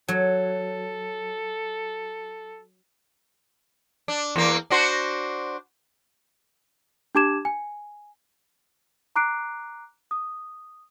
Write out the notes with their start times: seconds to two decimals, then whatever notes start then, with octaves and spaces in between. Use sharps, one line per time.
0.08 F#3 A4
4.08 D4
4.36 E2 A#3
4.70 D4 F#4 C5
7.15 D4 G4 A5 D6 G#6 E7
7.45 G#5
9.16 A#5 D6 F#6 C7 D7
10.11 D#6